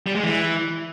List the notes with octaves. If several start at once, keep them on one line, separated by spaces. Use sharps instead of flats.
G3
G#3
E3